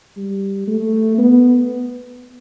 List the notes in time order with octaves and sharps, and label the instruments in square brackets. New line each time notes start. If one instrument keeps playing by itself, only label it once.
[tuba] G3
A3
B3